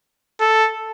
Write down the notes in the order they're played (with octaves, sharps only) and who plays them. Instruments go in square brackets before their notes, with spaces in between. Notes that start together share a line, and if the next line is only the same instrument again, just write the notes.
[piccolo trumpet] A4